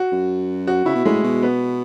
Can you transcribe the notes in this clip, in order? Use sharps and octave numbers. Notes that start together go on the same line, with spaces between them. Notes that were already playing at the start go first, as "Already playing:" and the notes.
Already playing: F#4
F#2
F#4
C#3 E4
B2
A2 G#3
B2
B3